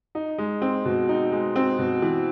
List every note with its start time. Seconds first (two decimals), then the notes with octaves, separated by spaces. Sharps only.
0.15 D#4
0.38 G#3
0.62 C4
0.85 B2
1.09 D#4
1.32 G#3
1.56 C4
1.79 B2
2.02 E3